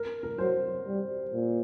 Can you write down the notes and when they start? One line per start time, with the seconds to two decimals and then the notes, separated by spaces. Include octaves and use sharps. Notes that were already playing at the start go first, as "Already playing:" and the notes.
Already playing: A#4
0.23 A#4
0.38 F#3 C5
0.86 G3
1.33 A#2